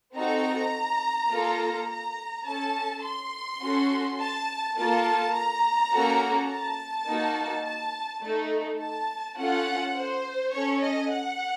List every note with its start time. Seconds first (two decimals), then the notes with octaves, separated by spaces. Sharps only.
0.16 C4 D#4 F#4 A4 A#5
1.31 A#3 F4 A4
1.89 A#5
2.47 C#4 A4 A5
3.05 C6
3.62 C#4 F#4 A4
4.20 A5
4.77 A#3 F4 A4 A5
5.35 A#5
5.93 A#3 C#4 F#4 A4
6.50 A5
7.08 A#3 D#4 F#4
7.65 A5
8.23 A3 D#4 A4
8.81 A5
9.38 C#4 F4 A4 F#5
9.96 C5
10.53 C#4 A4 C#5
10.83 D#5
11.11 F#5